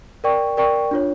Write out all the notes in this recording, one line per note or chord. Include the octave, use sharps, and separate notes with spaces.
A#4 D5 G5 C#6
A#4 D5 G5 C#6
D4 F4 C#5